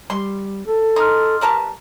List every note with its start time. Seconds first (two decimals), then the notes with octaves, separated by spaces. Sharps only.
0.10 G3 C6
0.66 A4
0.96 D#4 C6 D#6 F6
1.41 G3 A#4 B4 A5